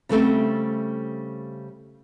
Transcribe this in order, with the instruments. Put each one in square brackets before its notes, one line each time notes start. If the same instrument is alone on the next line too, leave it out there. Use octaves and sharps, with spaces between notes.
[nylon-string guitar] C#3 G3 A3 C4